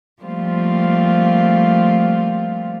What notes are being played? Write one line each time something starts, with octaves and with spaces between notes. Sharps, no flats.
F3 G3 A3 A#3 C4 F4